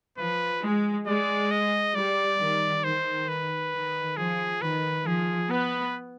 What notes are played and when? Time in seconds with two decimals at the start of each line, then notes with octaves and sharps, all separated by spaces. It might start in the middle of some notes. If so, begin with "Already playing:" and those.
0.18 F3 B4
0.62 G#3
1.06 G#3 D5
1.51 D#5
1.95 G3 D5
2.39 D#3
2.84 D#3 C5
3.28 B4
3.73 D#3
4.17 F3 G#4
4.61 D#3 B4
5.05 F3 G#4
5.50 B3 B4